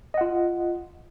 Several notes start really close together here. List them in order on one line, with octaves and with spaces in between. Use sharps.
D#5 F#5 F4